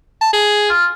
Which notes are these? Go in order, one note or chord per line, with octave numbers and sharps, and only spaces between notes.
A5
G#4
F4